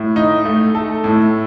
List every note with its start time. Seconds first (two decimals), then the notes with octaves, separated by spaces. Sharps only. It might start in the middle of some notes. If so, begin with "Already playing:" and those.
Already playing: A2
0.16 D#4
0.45 A3
0.75 A4
1.04 A2